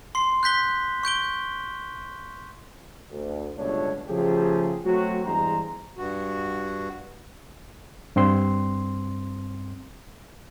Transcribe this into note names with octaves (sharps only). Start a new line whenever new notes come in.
C6 C7
F#6 G6 B6 G7
C#6 G6 D7 G7
D2
G1 C#2 B2 A3 D4 C#5
C#3 F3 F#3 A3 G4 G#4
F#3 A3 C4 F#4
E2 G2 G#3 C5 A#5
G2 F#4
G2 C4 C6